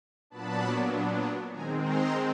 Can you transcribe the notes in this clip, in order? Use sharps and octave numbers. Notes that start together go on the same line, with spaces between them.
A#2 F#3 B3 D4 A5 B5
D#3 G#3 C4 G#5 A#5
A#5 C6